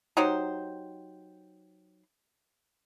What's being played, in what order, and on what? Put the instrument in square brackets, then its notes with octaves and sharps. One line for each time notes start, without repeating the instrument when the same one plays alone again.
[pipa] F#3 D#4 G4 C5